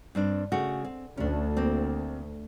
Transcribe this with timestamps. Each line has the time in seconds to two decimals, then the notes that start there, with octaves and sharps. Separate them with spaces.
0.15 G2 C4 D4
0.52 C#3 A3 F#4
0.84 C4
1.17 D2 C#4 D4
1.57 A#3 C4